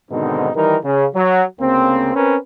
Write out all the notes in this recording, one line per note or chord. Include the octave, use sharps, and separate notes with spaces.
G#2 B2 D3 D#3 C4 D#4
D#3 E3 G3 D#4 A#4
C#3
F#3
D2 C#3 A#3 C4
C4 C#4 A#4 B4